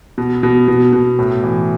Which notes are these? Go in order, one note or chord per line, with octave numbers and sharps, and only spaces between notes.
B2
B2
B2
B2
A2
E3